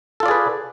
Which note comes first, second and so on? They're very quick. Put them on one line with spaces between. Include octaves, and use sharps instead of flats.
A4 F4 D5 G#4 B4